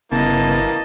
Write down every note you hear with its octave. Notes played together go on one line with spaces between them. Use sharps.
G1 C#3 E3 A#3 B3 D#5 A5